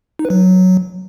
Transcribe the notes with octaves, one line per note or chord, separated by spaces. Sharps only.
D#4
B4
F#3